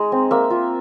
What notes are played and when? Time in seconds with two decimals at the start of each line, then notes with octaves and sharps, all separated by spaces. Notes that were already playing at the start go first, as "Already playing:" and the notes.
Already playing: G#3 D#4
0.12 C4
0.31 A#3 E5
0.50 F4